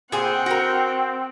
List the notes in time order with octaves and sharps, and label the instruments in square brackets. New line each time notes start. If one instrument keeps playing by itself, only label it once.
[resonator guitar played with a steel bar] A#2 G#4 C5 [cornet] C4 [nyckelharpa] F#5 G5
[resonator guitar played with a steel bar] F#4 A#4